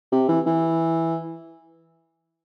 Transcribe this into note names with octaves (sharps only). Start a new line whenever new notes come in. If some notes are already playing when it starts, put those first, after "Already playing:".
C3
E3
E3